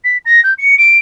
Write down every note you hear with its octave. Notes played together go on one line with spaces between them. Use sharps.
B6
A#6
G6
C#7
D7